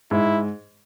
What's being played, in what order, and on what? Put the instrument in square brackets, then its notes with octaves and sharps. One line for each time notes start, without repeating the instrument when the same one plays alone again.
[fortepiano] G#2 [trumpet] E4